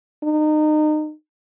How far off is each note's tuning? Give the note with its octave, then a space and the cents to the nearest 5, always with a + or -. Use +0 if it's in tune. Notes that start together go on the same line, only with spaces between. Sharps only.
D#4 -30